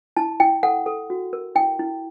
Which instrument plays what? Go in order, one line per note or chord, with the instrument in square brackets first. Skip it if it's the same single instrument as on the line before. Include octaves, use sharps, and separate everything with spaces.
[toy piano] E4 A5
E4 G5
A4 F#5
A4
F#4
A#4
E4 G5
E4